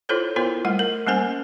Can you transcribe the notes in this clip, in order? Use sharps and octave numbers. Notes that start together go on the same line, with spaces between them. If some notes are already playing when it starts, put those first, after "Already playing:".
E4 F4 A4 C5 C#5
B3 E4 F4 A#4 C5
G3 A3 F#5
A#4
G3 A#3 C#4 C5 G#5